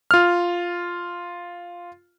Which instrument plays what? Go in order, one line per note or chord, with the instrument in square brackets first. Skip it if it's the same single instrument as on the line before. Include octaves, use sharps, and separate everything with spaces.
[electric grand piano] F4 F6